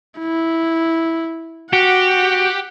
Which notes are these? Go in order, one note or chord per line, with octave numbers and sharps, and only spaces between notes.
E4
F#4 G4 F#5